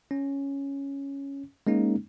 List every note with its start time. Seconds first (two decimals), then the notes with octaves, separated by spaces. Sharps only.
0.11 C#4
1.67 G#3 A#3 C#4 D#4